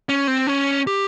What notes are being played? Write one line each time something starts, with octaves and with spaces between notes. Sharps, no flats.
C#4
C4
C#4
G4